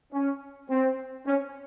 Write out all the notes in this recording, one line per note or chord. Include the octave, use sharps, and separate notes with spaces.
C#4
C4
C#4